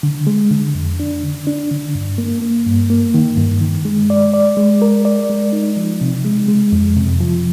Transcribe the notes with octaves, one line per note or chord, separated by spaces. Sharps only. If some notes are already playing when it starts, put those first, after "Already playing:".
D3
G#3
D3
F2
D4
D3
D4
D3
G2
A#3
A#3
G2
A#3
D#3
G2
D#3
G#3
D5
D5
G#3
A#4
D5
G#3
D#4
F3
C3
G#3
G#3
F2
C3
F3